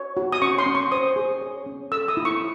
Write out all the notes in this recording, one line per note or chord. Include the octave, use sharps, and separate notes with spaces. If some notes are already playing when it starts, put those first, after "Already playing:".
Already playing: C#5
F#4
D#6
C#4 C#6
C6
C#4
C#6
C5 D#6
G#4
C#5
C#4
A4 E6
D#6
E4
C#6